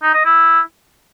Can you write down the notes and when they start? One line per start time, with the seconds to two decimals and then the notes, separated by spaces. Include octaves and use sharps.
0.03 D#4
0.14 D#5
0.25 E4